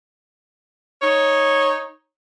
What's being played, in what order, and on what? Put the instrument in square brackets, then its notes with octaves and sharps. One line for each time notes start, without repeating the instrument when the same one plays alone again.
[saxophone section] D#4 C#5